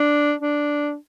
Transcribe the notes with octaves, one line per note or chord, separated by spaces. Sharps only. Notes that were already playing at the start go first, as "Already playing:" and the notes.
Already playing: D4
D4